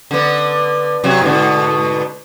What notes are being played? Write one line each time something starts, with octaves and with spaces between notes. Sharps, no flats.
D3 B3
C3 F#3
G#2 B2 D3